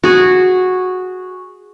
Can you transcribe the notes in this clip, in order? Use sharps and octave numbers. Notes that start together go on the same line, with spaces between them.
F#4 G#4